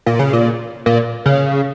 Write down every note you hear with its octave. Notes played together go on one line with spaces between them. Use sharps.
A#2
C#3
A#2
A#2
C#3